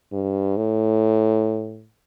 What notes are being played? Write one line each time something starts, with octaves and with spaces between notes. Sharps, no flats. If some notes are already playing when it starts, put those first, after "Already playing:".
G2
A2